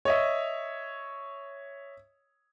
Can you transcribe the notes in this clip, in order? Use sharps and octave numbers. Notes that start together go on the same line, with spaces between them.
C#5 D#5 E5